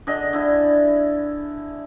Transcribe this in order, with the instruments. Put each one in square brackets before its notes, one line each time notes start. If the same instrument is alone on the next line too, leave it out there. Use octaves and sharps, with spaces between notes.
[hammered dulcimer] D3 G#4 D#5
D3 E4